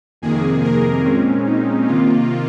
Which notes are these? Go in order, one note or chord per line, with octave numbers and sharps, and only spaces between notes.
F2 C3 D#3 A#3 G#4
A#4
A#2 G#3 C4 C#4
D#4
C3 D#3 A#3 F4